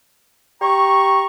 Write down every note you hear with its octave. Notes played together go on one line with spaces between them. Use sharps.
G4 A#5 C#6